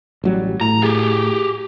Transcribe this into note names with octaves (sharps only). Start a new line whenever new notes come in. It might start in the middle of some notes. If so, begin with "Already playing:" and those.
A1 F#3 G3
A2 A#5
G4 G#4